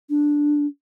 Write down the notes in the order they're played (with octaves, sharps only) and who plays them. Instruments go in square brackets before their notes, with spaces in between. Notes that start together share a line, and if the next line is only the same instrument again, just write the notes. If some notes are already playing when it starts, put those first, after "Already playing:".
[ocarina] D4